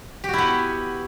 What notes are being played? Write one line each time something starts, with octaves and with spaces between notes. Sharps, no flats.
B3 E4 F#4 G4